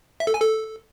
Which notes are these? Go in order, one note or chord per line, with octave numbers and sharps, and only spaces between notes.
E5
A4
G#5
A4